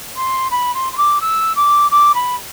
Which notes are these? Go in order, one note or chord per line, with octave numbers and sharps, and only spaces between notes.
C6
B5
C6
C6
D6
E6
D6
D6
B5